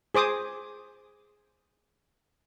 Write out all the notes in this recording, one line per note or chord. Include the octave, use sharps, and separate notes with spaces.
G#4 C5 D6 D#6